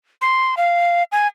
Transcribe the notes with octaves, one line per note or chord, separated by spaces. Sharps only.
C6
F5
G#5